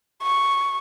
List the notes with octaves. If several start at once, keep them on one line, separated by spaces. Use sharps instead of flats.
C#6